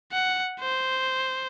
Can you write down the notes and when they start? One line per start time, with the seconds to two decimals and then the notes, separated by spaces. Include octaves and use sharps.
0.13 F#5
0.61 C5